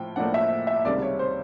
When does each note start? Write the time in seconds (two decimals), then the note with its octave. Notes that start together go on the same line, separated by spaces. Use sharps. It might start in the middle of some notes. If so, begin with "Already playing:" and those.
Already playing: A2 F3 G5
0.16 A2 F3 A#3 D4 F#5
0.34 E5
0.67 E5
0.84 C#2 C3 D#3 G3 D5
1.02 C#5
1.19 C5